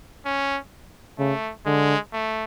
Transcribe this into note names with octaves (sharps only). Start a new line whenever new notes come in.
C#4
C#3 A3
D3 G#3
A3